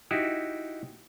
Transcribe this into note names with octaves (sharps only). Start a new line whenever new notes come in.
D#4 E4 F#4 G4